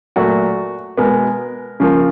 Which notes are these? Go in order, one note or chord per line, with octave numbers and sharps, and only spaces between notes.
A#2 F#3 A3 F#4
B2 G#3 B3 A#4
C#3 F3 A#3